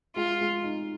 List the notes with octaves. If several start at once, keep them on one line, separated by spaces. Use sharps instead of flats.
G#3 F4
G#3
D#4